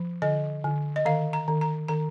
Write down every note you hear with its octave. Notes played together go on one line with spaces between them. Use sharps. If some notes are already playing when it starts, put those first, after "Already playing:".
Already playing: F3
D3 D#5
D3
D#5
D#3 F5
A#5
D#3
A#5
D#3 A#5